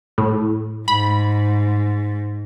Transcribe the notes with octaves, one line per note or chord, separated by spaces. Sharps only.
A2
G#2 B5